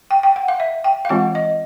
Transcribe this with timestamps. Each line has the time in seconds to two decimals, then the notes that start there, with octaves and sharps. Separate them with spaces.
0.11 G5
0.23 G5
0.36 F#5
0.48 F5
0.60 E5
0.84 G5
1.05 F5
1.09 E3 G#3 C4 F4 F#5
1.35 D#5